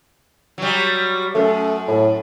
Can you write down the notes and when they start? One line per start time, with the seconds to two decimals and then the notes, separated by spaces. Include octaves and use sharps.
0.58 F#3 G3
1.35 F#2 A3
1.88 A2